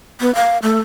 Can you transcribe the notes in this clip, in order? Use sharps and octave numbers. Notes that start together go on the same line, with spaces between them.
B3
F5
A3